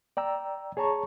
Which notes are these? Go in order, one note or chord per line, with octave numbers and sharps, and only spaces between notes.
D5 G5 A#5 E6
G#4 C#5 A5 A#5 C#6